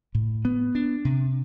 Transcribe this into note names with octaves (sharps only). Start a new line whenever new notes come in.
A2
B3
D4
C3